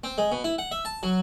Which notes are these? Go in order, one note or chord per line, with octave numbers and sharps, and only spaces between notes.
C4
G#3
B2
E4
F#5
E5
A5
F#3